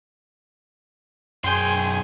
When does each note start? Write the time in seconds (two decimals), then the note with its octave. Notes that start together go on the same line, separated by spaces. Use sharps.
1.44 B1 F#2 G#4 G5 C6 G6